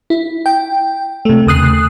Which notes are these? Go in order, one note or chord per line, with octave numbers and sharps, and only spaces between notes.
E4
G5
C3 A3
D#2 C#3 D#6 F#6 C7